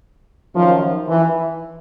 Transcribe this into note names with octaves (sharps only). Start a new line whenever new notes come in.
F#2 D#3 F3
E3